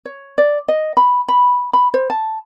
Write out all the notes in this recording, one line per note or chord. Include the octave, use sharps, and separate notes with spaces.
C#5
D5
D#5
B5
B5
B5
C5
A5